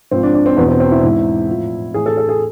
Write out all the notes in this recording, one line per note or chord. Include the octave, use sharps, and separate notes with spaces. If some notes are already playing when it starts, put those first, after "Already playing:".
G#2 F3 C4
D4
D4
C4
E2 B2 B3
C4
C4
E4
G#2 E3
A2 F3
A2 E3 G#4
A4
A4
G#4